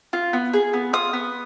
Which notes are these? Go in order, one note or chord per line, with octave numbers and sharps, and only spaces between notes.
F4
B3
G#4
B3
F4 D#6
B3